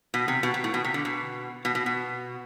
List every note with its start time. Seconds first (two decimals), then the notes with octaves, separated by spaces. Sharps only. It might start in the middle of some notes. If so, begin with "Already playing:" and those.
0.14 B2
0.28 C3
0.43 B2
0.54 B2
0.64 A2
0.74 B2
0.84 C3
0.94 D3
1.05 B2
1.65 B2
1.75 B2
1.86 B2